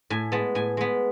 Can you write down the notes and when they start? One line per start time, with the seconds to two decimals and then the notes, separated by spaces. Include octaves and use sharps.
0.10 A2 G#5
0.32 G#3 B3 A5
0.55 A2 G#5
0.77 G#3 B3